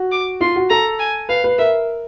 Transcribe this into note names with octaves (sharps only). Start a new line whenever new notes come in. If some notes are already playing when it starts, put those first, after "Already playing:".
Already playing: F#4
D6
F4 C6
F#4
A4 A#5
G#5
B4 F5
B4
A#4 E5